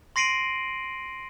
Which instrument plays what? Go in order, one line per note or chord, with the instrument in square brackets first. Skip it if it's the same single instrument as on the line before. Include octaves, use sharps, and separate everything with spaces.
[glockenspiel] C6 A#6 C7 D7 D#7 F#7